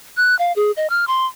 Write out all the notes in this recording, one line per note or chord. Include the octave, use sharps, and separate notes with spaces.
F#6
F5
G#4
D#5
F6
C6